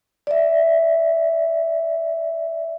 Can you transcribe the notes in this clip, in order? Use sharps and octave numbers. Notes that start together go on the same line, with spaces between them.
D5 E5